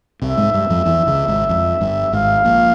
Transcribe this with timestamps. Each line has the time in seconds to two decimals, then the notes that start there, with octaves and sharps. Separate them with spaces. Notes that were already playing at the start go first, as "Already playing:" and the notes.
0.22 C2 C3 E5
0.38 G#2 G#3
0.53 G2 G3
0.70 F2 F3
0.85 E2 E3
1.07 C#2 C#3
1.28 G#1 G#2
1.49 F2
1.81 G1 G2
2.13 G#1 G#2 F5
2.44 A#1 A#2